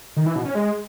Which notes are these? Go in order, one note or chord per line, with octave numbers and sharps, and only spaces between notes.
D#3
E3
B2
C#4
G#3